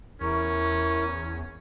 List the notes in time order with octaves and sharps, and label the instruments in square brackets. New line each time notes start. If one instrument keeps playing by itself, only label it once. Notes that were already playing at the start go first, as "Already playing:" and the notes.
[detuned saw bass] E2 [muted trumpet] C#4 [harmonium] E4 A#4 [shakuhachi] C#6